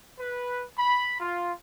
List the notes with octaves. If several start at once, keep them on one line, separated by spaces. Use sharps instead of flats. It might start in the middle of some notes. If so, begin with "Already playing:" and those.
B4
B5
F4